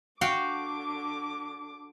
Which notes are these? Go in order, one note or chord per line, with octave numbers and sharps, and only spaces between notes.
D3 F#4 F5 G5 D6